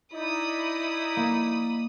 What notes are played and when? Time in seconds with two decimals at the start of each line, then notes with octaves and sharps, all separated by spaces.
0.13 D#4 E4 D5 B5 D#6
1.17 A#3